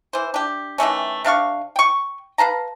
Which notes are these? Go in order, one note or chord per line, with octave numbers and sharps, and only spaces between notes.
E3 C5
D4 G4
D#3 E3 A3 C#4
C3 D4 F5 C#6
G5 C#6
B4 F5 A5 A#5